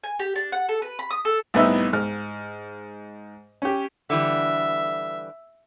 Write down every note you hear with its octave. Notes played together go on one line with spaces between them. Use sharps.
G#5
G4
D4
F#5
A4
B4
B5
D#6
A4
C2 A2 B3 D#4 E5 E6
G#2 F6
C#4 G4
D3 E3 G3 E5